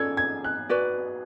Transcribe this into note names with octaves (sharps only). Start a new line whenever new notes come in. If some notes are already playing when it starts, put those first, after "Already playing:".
Already playing: C#4 F4 A4 D5 G#6
G#6
F#6
F#4 B4 D5